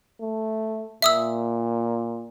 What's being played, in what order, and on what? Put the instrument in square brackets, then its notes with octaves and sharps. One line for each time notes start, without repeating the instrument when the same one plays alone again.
[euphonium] A3
[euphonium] A#2 [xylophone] E5 D#6 E6